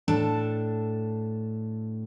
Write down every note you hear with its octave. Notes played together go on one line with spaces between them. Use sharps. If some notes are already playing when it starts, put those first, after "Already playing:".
A2 D4 A4 A5